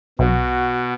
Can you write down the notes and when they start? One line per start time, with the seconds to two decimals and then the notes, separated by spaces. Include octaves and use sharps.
0.19 B1 B2 F#4